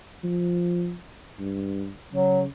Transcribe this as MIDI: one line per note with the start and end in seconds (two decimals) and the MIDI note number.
0.24 0.95 53
1.39 1.90 43
2.13 2.48 49
2.13 2.41 54